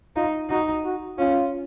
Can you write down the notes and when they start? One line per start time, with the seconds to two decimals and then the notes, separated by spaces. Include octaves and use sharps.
0.16 D#4 F4
0.50 D#4 F#4
0.85 F#4
1.18 C#4 F4